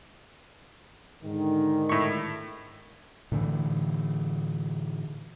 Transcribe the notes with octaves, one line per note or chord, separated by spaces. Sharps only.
G#2 D3 D#3
A2 C#6
A2 D3 E3